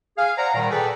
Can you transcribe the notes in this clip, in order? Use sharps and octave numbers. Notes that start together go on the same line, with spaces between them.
G#4 F5
C5 D5 F#5 A#5
A#2 D#3 G3
G#4 A4 B4 D5 G5